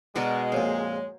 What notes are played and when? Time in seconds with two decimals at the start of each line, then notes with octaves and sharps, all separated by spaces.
0.16 B2 G#3 D4 F#4 A#4
0.52 A#1 F2 A#2 C5 C#5